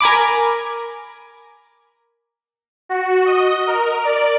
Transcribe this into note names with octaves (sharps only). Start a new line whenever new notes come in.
A#4 G#5 B5 D6
F#4
D#5
A#4
D5